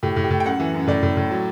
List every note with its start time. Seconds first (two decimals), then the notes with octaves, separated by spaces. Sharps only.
0.03 A2 G4
0.16 A2
0.24 G4
0.30 A2
0.40 G5
0.45 F#2 F#5
0.60 E3
0.74 F#2
0.88 A2 D5
1.03 A2
1.17 A2
1.31 F#3